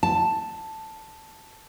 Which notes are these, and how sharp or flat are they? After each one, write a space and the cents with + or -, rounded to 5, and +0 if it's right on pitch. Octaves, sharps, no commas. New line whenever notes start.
A5 +5